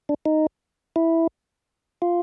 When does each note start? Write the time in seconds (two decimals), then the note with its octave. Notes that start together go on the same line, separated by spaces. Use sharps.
0.09 D4
0.26 D#4
0.96 E4
2.02 F4